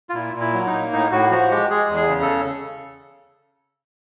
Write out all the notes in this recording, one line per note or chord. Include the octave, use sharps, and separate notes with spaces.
F4
A#2 E4
A#2
E4
F#3
D#4
A#3
A2 D#4
A2 F#4
F3 F#4
G#3 G4
G#3 G#4
E2
G#4
C#3
A4